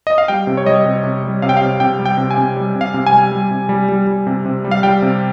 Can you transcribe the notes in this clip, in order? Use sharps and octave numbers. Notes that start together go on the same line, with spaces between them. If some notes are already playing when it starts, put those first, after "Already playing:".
D#5
F5
G3 G5
C3
C#5
G3 D#5
C3
C3
G3
C3 F5
G5
C3 F5
C3 G5
G3
G5
C3
G#5
C3
G3
C3
F5
C3
G#5
G3
G3
C3
G3
G3
G3
C3
C3
G3
F5
G3 G5
C3